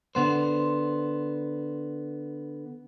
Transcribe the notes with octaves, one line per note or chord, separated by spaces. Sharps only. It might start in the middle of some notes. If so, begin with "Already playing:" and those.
D3 B3 C5